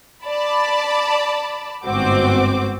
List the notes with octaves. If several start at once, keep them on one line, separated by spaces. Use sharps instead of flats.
D5 A5 B5
G1 G#2 C4 F#4 D6